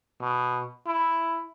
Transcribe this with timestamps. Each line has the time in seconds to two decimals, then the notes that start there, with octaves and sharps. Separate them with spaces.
0.21 B2
0.87 E4